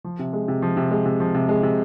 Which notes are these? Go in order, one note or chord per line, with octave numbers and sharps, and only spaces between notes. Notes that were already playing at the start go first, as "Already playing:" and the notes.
F3
C3
G#3
C3
F3
C3
G#3
C3
F3
C3
G#3
C3